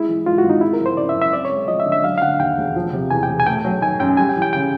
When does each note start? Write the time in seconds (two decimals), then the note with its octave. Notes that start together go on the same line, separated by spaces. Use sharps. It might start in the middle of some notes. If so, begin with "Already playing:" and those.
Already playing: G#3 E4
0.09 E3
0.26 G#2 F4
0.38 F#4
0.43 G#1
0.49 D#4
0.61 G#3 E4
0.73 A#4
0.79 F3
0.86 C5
0.97 C#3 D5
1.09 E5
1.14 F#2
1.22 E5
1.33 C4 D5
1.45 C#5
1.50 G#3
1.68 F3 D#5
1.80 E5
1.86 D3
1.92 E5
2.03 F#3 F5
2.18 F5
2.22 D3 F#5
2.39 D#2 G5
2.58 E1
2.76 F3
2.93 C3
3.11 E2 G#5
3.23 G5
3.28 E1
3.40 G#5
3.47 A3 G5
3.64 F#3
3.82 D#3 G#5
3.99 F#2 G5
4.17 G3 G#5
4.29 G5
4.36 E3
4.42 G5
4.53 C#3 G5